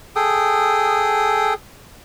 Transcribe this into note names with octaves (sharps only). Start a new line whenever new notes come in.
G#4 A4 G5 D#6